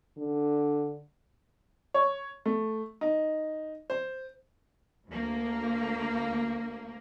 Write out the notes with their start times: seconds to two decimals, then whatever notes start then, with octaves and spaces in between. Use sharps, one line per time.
0.18 D3
1.94 C#5
2.46 A3
3.01 D#4
3.90 C5
5.09 D2 A#3